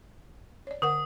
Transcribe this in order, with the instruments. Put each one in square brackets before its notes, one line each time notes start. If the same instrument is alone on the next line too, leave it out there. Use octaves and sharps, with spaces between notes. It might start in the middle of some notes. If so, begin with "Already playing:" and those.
[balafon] C#5 D5
[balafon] D3 A#4 F#5 [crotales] D#6